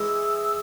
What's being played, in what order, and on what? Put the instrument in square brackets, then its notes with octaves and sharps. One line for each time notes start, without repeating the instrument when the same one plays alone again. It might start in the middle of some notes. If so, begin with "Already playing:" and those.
Already playing: [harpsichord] E3 G#3 [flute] E6